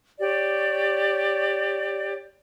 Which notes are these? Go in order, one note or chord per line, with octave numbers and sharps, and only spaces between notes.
G4 C#5 D5